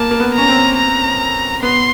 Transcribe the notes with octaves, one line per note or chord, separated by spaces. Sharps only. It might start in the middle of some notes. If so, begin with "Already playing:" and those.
Already playing: A#3 A5
A#3
B3
C#4 A#5
C4
A#5
B3 C6